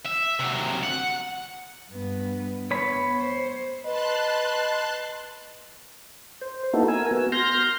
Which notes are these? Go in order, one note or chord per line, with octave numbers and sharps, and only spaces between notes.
E5
C3 F#3
F#5
G2 B3
B3 C#5 B5
C5
B4 D#5 A5 C6 F#6
C5
A#3 B3 D#4 E4 F#4 A4
A#4 G#5 E6
B3 F#4
C6 F6 G6 A#6